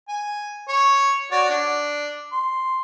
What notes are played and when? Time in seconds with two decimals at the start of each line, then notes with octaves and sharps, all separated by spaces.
0.09 G#5
0.68 C#5
1.31 F#4 C#5 D5
1.50 D4
2.32 C6